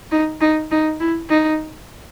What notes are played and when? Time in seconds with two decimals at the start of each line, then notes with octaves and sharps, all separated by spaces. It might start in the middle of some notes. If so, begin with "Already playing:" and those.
0.12 D#4
0.41 D#4
0.71 D#4
1.00 E4
1.30 D#4